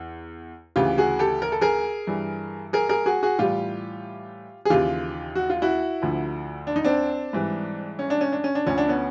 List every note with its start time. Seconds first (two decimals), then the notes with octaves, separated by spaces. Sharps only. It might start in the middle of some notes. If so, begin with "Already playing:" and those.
Already playing: E2
0.76 D2 C#3 E3 F4 G4
0.98 F#4 G#4
1.19 G4 A4
1.42 A#4
1.52 A4
1.61 G#4 A#4
2.07 G2 E3 G3
2.73 G#4 A#4
2.89 G#4 A#4
3.06 F#4 G#4
3.23 F#4 G#4
3.39 A2 E3 G3 F4 G4
4.65 G#4
4.70 D#2 C#3 E3 F4 G4
5.35 F#4
5.50 F4
5.62 E4 F#4
6.02 D2 D3 F3
6.67 D4
6.76 D#4
6.85 C4 D4
7.33 G#2 E3 G3
7.99 C#4
8.10 D4
8.21 C#4
8.32 D4
8.44 C#4
8.55 D4
8.65 D2 D3 F3 C#4
8.78 D4
8.89 B3 C#4